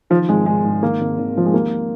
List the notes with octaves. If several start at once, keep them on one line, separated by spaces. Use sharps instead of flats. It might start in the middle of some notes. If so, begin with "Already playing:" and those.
D#3 F3
G#1 G#3
G#1 G#3
G#2
D#3 A#3
G#1
G#1
G#2 F3
G#3
D#2 A#3